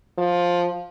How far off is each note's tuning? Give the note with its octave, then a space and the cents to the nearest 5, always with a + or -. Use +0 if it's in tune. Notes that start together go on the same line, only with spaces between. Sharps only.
F3 +10